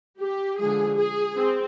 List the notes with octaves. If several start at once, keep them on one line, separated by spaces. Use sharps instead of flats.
G4
D3 F3 G#3 G#4
G#4
C4